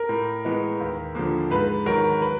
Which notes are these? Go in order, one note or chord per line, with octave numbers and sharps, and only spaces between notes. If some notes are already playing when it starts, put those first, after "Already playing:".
Already playing: A#4
A2
E3 G#3 B3
D#2
D3 F3 A#3
G#2 B4
D#3 F#3 A#4
B4